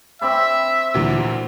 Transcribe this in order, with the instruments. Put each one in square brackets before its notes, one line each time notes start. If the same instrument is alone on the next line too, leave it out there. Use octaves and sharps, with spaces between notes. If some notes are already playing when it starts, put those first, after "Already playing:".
[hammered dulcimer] C4 D5 B5 [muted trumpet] E5
[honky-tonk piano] D2 A#2 E3